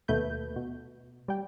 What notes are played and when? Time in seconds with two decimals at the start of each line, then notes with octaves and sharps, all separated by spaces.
0.08 D#2 B2 A3 B4 G6
0.56 B2
1.28 G3 G5